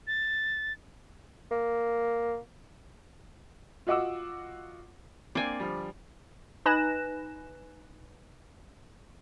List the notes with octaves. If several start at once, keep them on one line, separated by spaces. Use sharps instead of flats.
A6
A#3
F4 F#4 D#5 F#5 D6 E6
A#3 C4 D4 D5 G#5
D3 F3 G3
D#4 B4 G#5 F#6 A#6 E7